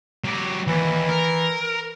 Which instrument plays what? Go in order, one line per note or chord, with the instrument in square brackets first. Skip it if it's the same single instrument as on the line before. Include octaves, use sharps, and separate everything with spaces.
[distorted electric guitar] F#3 G4
[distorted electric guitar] D#2 [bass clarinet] E3
[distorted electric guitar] A#4